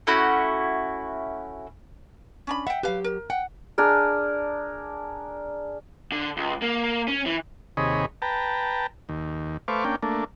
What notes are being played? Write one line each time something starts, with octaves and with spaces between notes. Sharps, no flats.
A3 C#4 E4 F#4
C#4 D4 B5
E5 F#5 G5
F#3 G4 B4 F5
A#4
F#5 G5
D4 G#4 A#4
D3
C#2
A#3
C#4
E3
D#2 C3 G#4 C#5 D#5 B5
B4 G5 A5 A#5
D#2
A3 B4 C5 F5 C#6 D6
A#3 C#4 D4 G5
A3 A#3 D4